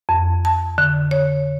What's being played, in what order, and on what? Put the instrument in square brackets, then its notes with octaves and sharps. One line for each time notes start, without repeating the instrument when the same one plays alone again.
[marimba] F2
A5
D3
C#5